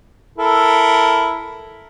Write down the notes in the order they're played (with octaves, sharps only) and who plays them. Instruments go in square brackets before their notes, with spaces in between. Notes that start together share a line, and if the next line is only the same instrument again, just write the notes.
[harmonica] E4 A4 A#4